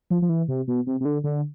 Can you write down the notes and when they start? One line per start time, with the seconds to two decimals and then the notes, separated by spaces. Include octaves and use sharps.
0.10 F3
0.22 F3
0.29 E3
0.48 C3
0.67 B2
0.87 C3
1.00 C3
1.05 D3
1.24 D3